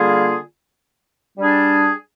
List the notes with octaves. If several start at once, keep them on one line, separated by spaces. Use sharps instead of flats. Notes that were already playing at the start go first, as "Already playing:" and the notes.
Already playing: D3 G3 A#3 F4 G#4
G3 D4 G#4